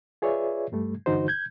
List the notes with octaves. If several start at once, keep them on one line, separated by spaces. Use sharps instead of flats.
F4 G#4 B4 C#5 D5 E5
G2 G3 A3
G2 D3 E3 D#4 F#4 C5
G6 G#6